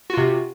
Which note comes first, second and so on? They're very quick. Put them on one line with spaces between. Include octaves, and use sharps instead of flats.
F#4 F4 C3